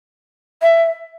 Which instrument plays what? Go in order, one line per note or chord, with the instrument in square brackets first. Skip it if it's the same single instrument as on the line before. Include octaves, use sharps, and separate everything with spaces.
[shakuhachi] E5